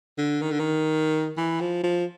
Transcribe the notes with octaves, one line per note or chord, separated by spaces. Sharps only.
D3
D#3
D3
D#3
E3
F3
F3